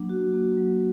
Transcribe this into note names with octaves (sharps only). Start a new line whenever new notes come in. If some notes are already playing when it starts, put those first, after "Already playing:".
Already playing: F#3 A#3 D4
F#4
A#3
F#3